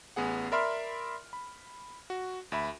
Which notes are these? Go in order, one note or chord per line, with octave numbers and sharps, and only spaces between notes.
A1 B3 G#4 F#5
A#4 D5 E5 B5 C6 F6
B5
F#4
D2 E5 B5